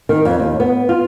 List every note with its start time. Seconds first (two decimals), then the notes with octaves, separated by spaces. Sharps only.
0.09 D#3
0.25 F2
0.40 D#2
0.60 B3
0.89 F4